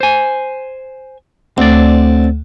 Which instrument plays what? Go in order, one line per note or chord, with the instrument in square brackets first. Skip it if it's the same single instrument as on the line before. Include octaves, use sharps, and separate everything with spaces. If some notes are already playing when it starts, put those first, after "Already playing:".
[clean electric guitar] C5 G#5
[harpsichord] D2 [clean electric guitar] C4 D5